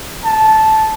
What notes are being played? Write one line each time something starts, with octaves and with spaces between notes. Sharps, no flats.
A5